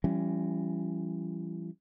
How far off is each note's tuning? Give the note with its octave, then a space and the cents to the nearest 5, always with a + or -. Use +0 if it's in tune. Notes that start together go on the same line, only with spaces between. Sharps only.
E3 +35 G3 -5 C#4 +0